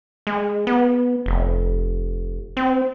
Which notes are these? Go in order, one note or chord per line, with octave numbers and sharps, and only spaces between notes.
G#3
B3
F1
C4